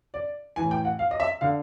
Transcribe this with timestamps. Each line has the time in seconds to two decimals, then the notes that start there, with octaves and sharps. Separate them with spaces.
0.14 D5
0.56 A2 E3 G#5
0.71 G5
0.85 F#5
0.99 F5
1.11 D#5
1.20 E5
1.41 D3 F5